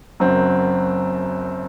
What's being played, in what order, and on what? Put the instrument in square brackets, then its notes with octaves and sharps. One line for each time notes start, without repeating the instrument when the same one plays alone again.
[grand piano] F#1 F#2 F#3 C4